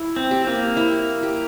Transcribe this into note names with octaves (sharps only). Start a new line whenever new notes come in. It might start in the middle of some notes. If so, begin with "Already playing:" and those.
Already playing: E4
C4
G4
A#3
E4
G4